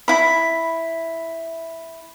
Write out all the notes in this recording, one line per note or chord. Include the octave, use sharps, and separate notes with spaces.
E4 B5